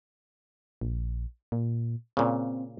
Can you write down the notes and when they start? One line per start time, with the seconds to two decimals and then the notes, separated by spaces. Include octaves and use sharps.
0.81 A#1
1.52 A#2
2.17 A#2 C#3 C4